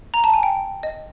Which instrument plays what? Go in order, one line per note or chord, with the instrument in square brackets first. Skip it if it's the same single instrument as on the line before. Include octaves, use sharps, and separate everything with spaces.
[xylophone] A#5
A5
G#5
G5
D#5